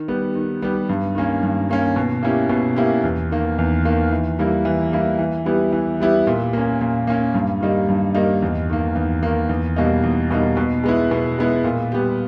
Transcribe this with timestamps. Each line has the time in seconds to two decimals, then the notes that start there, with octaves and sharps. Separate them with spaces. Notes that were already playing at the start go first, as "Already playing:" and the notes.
Already playing: D#3
0.08 G3 B3 G4
0.35 D#3
0.62 G3 B3 G4
0.89 G2
1.15 D#3 A#3 C#4
1.43 G2
1.69 D#3 A#3 C#4
1.96 B2
2.23 A#3 C#4 E4 G4
2.50 B2
2.76 A#3 C#4 E4 G4
3.04 E2
3.31 D#3 A#3
3.58 E2
3.85 D#3 A#3
4.12 E3
4.39 G3 A#3 E4
4.65 E3
4.92 G3 A#3 E4
5.19 E3
5.45 G3 B3 E4 G4
5.72 E3
6.00 G3 B3 E4 G4
6.27 A#2
6.53 A#3 C#4
6.81 A#2
7.07 A#3 C#4
7.34 G2
7.61 D#3 G3 A#3 D#4
7.88 G2
8.15 D#3 G3 A#3 D#4
8.42 E2
8.70 D#3 A#3
8.95 E2
9.23 D#3 A#3
9.49 E2
9.76 B2 G3 A#3 D#4
10.04 E2
10.31 B2 G3 A#3 D#4
10.57 B2
10.84 G#3 B3 E4
11.11 B2
11.39 G#3 B3 E4
11.64 A#2
11.92 G3 B3 G4